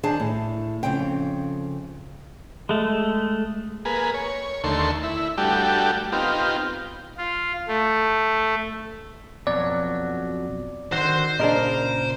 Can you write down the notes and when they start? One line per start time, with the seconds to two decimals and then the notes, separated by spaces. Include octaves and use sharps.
0.03 D#3 D4 G#4 C5 A5
0.20 A2
0.83 F2 C#3 C4 G5
2.69 G#3 A3
3.85 A#3 G#4 B4
4.14 C#5
4.64 D#2 D3 A3 C6 C#6
5.03 E4
5.38 G3 A3 D4 F#4 G4
6.12 B3 C4 D#4 F4 G4
7.17 F4
7.68 A3
9.47 F2 B2 F#3 D5
10.92 D3 D#3 F#4 C5 C6
11.39 A#2 C#3 D4 G#4 A#4 D#5